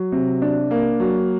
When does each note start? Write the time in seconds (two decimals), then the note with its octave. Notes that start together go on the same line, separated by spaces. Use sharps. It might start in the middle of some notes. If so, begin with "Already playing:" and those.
Already playing: F#3
0.12 C3
0.42 D4
0.71 A#3
1.00 F#3